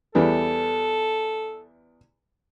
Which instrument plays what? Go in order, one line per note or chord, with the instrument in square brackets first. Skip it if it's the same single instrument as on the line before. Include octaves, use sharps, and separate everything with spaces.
[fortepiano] E2 E3 G3 [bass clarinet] A4